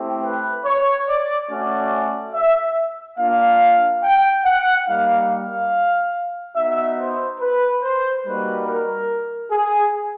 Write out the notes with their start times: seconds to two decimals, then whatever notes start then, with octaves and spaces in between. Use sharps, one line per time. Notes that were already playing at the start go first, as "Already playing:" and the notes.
Already playing: A3 C4 E4 G4
0.24 B4
0.65 C#5
1.08 D5
1.50 A3 C#4 F#4 D5
2.35 E5
3.18 A#3 D4 F4 F5
4.03 G5
4.45 F#5
4.87 G3 A#3 D#4 F5
5.29 F5
6.56 B3 D#4 F#4 E5
6.98 C5
7.40 B4
7.83 C5
8.25 G3 A#3 D#4 F#4 B4
8.66 A#4
9.51 G#4